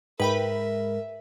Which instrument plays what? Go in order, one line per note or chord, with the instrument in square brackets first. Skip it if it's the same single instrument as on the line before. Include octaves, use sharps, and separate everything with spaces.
[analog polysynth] G#2 [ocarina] A#4 [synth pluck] B4 G5 B5 [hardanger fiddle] E5